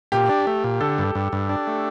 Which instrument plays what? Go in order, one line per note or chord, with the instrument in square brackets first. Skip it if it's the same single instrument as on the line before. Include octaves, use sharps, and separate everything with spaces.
[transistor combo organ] A#2 [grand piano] G4
[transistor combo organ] D4
A3
A#2
[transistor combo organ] D3 [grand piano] A4
[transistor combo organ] G2
G2
G2
D4
A3